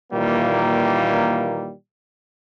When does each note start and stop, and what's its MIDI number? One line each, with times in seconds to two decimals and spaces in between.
0.13 1.70 46
0.13 1.70 51
0.13 1.70 52
0.13 1.70 55
0.13 1.70 58